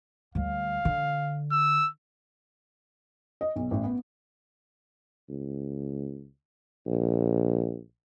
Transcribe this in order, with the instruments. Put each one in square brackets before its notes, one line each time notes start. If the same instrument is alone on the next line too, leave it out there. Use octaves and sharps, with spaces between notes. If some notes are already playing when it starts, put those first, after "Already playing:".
[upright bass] D2 G3 [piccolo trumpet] F5
[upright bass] D3
[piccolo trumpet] E6
[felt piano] D#5
B1
A1
B3
[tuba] C#2
A#1